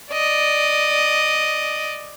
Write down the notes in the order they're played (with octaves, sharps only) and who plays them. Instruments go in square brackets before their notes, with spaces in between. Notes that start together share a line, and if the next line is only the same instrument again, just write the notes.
[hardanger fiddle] D5 D#5